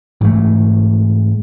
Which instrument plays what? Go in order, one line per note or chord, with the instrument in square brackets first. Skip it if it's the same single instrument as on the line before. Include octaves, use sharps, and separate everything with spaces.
[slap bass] G#2 E3 A3